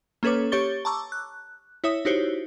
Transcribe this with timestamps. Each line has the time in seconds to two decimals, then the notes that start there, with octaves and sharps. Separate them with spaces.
0.23 A#3 C#4 A4 B4 C#5 D6
0.52 G4 C#5 C#6 A6 G7
0.85 A5 A#5 C#6 D6 E6
1.12 F#6
1.84 E4 C#5 E5 D#6
2.05 D#4 E4 F#4 G4 C5 C#5